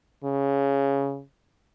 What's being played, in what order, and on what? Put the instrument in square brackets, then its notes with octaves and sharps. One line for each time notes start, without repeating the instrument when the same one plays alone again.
[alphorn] C#3